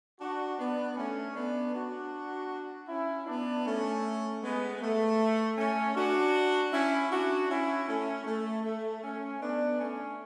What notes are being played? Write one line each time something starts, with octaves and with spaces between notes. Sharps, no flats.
D4 F#4
B3 D4
A3 C#4
B3 D4
D4 F#4
C#4 E4
B3 D4
A3 C#4
G#3 B3
A3
A3 C#4
D4 F#4
C#4 E4
D4 F#4
C#4 E4
A3 C#4
A3
A3
A3 C#4
B3 D4
A3 C#4